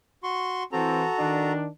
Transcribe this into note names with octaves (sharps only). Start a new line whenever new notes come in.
F#4 C6 C#6
E3 C4 F#4 A4 A#5
D#3 D4